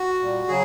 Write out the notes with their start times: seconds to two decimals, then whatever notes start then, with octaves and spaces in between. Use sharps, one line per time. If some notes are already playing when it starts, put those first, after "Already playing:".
Already playing: F#4
0.20 A#2 G3
0.48 C#3 F#3 G#4